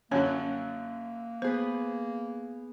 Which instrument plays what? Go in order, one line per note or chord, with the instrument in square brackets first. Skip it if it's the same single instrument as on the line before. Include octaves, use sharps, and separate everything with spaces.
[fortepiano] F#2 D3 F#3 [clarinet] A#3 [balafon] C#4 C#5
[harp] B3 G#4 B4 [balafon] C5